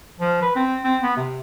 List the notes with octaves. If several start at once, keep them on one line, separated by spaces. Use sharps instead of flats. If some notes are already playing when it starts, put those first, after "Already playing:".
F3
B4
C4
C4
B3
C3